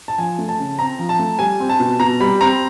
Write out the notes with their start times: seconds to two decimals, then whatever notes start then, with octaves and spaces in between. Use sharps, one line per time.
0.08 A5
0.18 F3 G#5
0.38 A3
0.49 A5
0.59 C#3
0.79 C4 A#5
0.99 F3
1.09 A5
1.19 A3
1.39 G3 G#5
1.60 C4
1.69 A5
1.80 B2
2.00 B2 A#5
2.20 G3 B5
2.41 C4 A#5